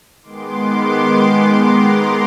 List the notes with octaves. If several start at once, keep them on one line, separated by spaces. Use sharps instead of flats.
D#3 G#3 B3 C6 D6
A#5 C6